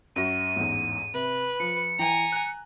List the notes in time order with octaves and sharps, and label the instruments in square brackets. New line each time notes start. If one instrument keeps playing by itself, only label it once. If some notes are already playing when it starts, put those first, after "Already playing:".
[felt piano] F#2 F#4 A#6 [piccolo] D#7
[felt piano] A1 E2 G#2
[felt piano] C3 [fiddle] B4
[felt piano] F3 [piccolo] C#7
[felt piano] E3 G5 [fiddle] G#5 A#5
[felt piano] F#6